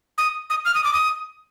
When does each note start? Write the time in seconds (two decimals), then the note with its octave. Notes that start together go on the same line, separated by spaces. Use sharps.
0.18 D#6
0.50 D#6
0.65 F6
0.75 D#6
0.84 D6
0.93 D#6